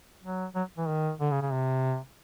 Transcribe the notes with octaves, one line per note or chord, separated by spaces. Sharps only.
F#3
F#3
E3
D#3
D3
C#3
C#3
C3